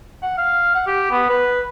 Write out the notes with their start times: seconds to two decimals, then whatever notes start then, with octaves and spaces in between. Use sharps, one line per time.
0.22 F#5
0.38 F5
0.75 F#5
0.87 G4
1.11 B3
1.29 B4